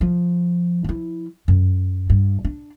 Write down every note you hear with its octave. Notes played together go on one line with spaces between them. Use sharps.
F3
F3 E4
F#2
G2
D4